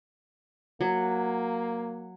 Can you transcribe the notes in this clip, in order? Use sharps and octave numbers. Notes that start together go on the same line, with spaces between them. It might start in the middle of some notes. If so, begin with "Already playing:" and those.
F#3 A#3